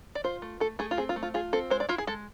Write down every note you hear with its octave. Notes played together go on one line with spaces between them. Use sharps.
D5
F4 C5
A3
A3 A4
A3 G#4
F4
C4 G#4
F4
A3
F4
F4 G#4
C4 A4
G#3 C5
D5
E4 F4
G#4
G#3 A4